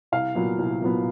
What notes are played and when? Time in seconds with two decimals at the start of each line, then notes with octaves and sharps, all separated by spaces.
0.12 C2 F5
0.35 A#2 F#3 B3
0.59 C2
0.82 A#2 F#3 B3